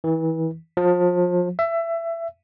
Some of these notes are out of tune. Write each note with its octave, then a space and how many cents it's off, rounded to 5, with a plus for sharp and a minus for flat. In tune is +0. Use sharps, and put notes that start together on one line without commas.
E3 -30
F3 +30
E5 +20